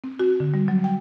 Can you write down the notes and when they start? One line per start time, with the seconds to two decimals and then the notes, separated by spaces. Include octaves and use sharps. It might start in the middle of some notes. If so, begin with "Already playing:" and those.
0.04 C4
0.19 F#4
0.40 D3
0.54 G3
0.68 F#3
0.84 G5